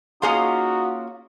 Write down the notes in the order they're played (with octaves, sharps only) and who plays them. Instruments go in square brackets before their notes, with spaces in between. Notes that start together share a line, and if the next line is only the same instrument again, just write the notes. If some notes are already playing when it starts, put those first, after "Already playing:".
[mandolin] A#3 C#4 F4 [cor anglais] D#4 [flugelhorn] F#4 [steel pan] G#4 C6